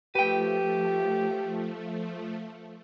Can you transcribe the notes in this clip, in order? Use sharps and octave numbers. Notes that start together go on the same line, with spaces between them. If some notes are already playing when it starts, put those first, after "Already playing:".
F3 A3 G4 B4 G5